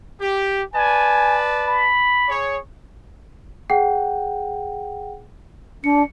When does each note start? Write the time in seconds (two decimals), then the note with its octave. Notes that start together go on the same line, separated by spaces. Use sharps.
0.20 G4
0.74 B4 D5 G#5 A5
1.67 B5
2.28 G#4 C#5
3.70 G#4 F#5 G5
5.84 D4 C#7